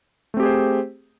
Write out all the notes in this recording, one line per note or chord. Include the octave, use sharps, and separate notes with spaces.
A3 C4 G4 G#4 C5